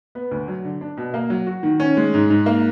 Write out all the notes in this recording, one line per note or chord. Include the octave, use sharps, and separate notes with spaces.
B3
D2
F#3
D3
D4
B2
A#3
F#3
F#4
D#3
C#4
G#3
G#2
G#2
A#3